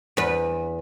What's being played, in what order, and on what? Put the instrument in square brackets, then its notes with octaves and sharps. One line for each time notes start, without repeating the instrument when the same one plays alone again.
[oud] E2 B4